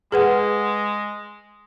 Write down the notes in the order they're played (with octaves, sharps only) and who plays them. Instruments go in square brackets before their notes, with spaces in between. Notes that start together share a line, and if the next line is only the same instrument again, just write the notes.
[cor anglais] G#3 [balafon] G#4 B4 F#5